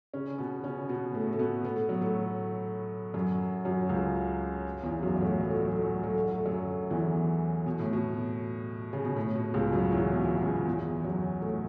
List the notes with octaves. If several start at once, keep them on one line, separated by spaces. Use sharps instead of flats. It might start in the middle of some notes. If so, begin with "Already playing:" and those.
C#3 C#4
B2 B3
C#3 C#4
B2 B3
A2 A3
A3
B2 B3
B3
A3
F#3
A2 A3
F#2 F#3
F#2 F#3
C#2 C#3
E2 E3
F#2 F#3
F#3
A2 A3
F#3
A3
F#3
A3
F#3
A3
F#3
A3
F#3
A3
F#2 F#3
E2 E3
B2
A2
B2
C#3
B2
A2
B2
C#2 C#3
F#2 F#3
E2 E3
B2
C#2 C#3
B2
C#2 C#3
E2 E3
F#2 F#3
A2 A3